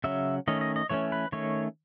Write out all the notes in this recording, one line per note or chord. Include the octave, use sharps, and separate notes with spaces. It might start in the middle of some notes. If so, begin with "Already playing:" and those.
C#3 F#3 C#4 E5
D#3 A3 C#4 D#5
D#5
D#5
E3 A3 C#4 C#5
B4
D#3 A3 C#4 C#5